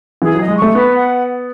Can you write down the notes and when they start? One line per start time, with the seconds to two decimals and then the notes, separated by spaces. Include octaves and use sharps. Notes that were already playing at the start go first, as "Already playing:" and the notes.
0.22 E3 G#4
0.35 F#3
0.40 D#5
0.48 G#3
0.57 A3 C#6
0.75 B3 B4
0.93 F#5